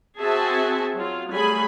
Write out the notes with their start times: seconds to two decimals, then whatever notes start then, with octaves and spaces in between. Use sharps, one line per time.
0.19 C4 F#4 G#4 E5 G#5 A5
0.94 F#3 F4
1.30 F#3 G3 A3 G#4 G#5 B5